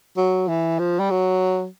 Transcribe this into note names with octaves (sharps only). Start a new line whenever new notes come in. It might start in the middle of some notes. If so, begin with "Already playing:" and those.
F#3
E3
F3
G3
F#3